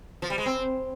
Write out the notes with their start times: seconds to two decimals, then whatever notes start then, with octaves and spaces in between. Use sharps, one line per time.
0.22 F3
0.30 G3
0.38 G#3
0.46 C4